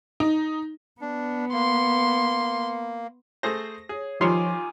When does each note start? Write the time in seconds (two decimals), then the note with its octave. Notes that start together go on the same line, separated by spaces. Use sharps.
0.20 D#4
1.01 B3 D4
1.53 A#3 C6
3.43 A3 G#4 C5 A#6
3.89 G#4 C#5
4.21 D#3 F3 G3 F4 C#5 G#5 C6 D6